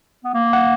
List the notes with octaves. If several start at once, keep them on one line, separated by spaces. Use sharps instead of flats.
B3
A#3
F#5